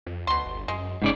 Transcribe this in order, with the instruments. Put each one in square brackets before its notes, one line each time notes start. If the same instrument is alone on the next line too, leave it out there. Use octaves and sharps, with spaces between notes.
[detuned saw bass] F2
[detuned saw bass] D2 [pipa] B2 C6
[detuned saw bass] G1
[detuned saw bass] F#2 [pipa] G#3
[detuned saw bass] G1 [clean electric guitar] G#2 C#3 D5